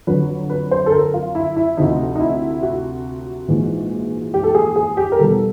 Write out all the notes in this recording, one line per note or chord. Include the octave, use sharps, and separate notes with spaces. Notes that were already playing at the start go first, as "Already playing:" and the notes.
F2 D3 F#3 B4
B4
C5
A4
A#4
F4
E4
E4
D2 C3 F3 D#4
D#4
E4
F#4
A#1 G#2 E3 G#3
G4
A4
G#4
G#4
G4
A#4
E2 B2 G3 A4